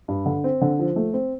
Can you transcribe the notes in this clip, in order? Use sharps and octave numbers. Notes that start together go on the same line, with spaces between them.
G2
D3
C4
D3
F3
A3
C4